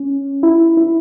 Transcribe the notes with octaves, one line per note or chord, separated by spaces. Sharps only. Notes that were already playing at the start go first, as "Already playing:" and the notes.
Already playing: C#4
E4
E4